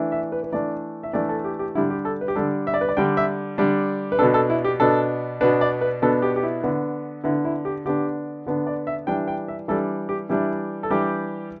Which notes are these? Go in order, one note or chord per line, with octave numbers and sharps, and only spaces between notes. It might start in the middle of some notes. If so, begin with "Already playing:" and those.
Already playing: E3 A3 D4
E5
B4
B4
E3 A3 D4 D5
E5
E3 A3 D4 D5
A4
G4
G4
D3 G3 D4 E4
G4
A4
B4
G4
D3 G3 D4 A4
E5
D5
B4
D5
D3 G3 D4 G5
E5
D3 G3 D4
B4
B2 B3 D4 A4
A4
E4
G4
B2 B3 D4 A4
B2 B3 D4 B4
D5
B4
B2 B3 D4 A4
G4
G4
E4
D3 B3 D4
D3 B3 D4 E4
E4
G4
D3 B3 D4 G4
D3 B3 D4
D5
E5
E3 G3 D4 G5
G5
E5
E3 G3 D4 A4
G4
E3 G3 D4 E4
A4
E3 G3 D4 G4